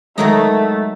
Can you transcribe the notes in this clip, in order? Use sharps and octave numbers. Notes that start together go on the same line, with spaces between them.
D#3 F#3 G#3 A3 D#4